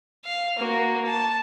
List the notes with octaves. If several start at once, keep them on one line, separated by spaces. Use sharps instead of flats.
F5
A#3 F#4
A5